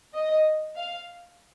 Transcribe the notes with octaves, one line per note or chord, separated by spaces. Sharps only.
D#5
F5